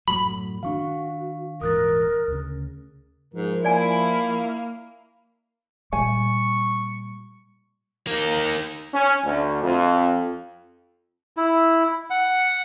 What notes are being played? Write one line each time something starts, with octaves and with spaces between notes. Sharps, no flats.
F#2 A2 F#3 B5
D#3 C#4 D4 F#4 F5 C#6
D#1 G#2 E3 A#4 D#6 F#6 A6
D2 C#3
G#2 F3 A#4
A#3 E4 D5 G#5
A#2 G3 G#5 C#6
A#3 D#4
C#4
D2
F2
E4
F#5